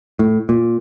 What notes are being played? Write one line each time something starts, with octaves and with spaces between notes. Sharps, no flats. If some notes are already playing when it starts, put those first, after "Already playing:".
A2
A#2